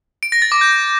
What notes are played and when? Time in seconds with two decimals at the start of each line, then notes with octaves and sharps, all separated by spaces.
0.23 D7
0.32 A#6
0.42 A6
0.52 D6
0.61 G6